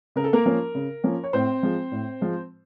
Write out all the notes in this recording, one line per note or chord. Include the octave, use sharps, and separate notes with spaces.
C#3 A#4
A4
A#3 A#4
F3 A#3 C#4
C#3
F3 A#3 C#4
C#5
A2 C4 C5
F3 G#3
A2
F3 G#3